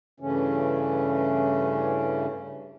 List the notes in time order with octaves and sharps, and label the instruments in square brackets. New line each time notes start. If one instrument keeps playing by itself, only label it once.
[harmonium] G2 C#3 E3 A3 C#4